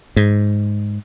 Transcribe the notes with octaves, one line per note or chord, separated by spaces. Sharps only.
G#2